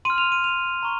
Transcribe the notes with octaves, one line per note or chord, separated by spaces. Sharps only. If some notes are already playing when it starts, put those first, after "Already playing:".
C6 F6 D#7
F7
D#7
F7
A#5 C#6